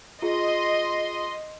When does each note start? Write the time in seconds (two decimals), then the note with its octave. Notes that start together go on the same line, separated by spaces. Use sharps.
0.22 F4 G#4 D#5 C6